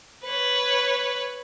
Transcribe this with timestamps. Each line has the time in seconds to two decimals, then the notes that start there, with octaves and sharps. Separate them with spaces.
0.25 B4 C#5